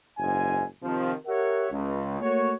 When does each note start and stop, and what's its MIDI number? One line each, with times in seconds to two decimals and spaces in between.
0.18 0.63 30
0.18 0.63 44
0.18 0.63 80
0.83 1.12 48
0.83 1.12 51
0.83 1.12 53
1.26 1.66 67
1.26 1.66 70
1.26 1.66 73
1.26 1.66 76
1.26 1.66 78
1.70 2.20 37
2.21 2.52 57
2.21 2.52 58
2.21 2.52 66
2.21 2.52 73